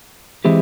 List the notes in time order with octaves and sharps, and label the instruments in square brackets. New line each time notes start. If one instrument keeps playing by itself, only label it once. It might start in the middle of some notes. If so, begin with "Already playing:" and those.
[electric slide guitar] E3 G#3 C4 E4 G4